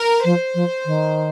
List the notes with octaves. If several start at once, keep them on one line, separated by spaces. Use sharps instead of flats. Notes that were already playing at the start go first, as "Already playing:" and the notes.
Already playing: A#4
F3 C5
F3
D#3